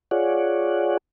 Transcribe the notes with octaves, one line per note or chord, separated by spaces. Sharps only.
F4 G#4 C#5 D5 F#5